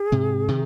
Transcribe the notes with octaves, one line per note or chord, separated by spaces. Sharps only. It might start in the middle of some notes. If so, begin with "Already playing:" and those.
Already playing: G#4
G#2 C3
C3 D#3